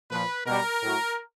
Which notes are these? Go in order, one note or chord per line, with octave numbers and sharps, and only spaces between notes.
A#2 F3 B4
B2 G3 A#4
A2 F#3